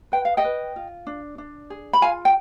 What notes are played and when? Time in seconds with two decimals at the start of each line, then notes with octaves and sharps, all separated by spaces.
0.12 B4 G5
0.25 F5
0.37 D#5 G5
0.44 B4
0.76 F4
1.07 D4
1.38 D4
1.70 G#4
1.93 B5
2.02 F4 F5 G#5
2.25 G5